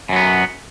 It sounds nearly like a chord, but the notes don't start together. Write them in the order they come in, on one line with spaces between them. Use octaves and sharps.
F#2 F#3 B3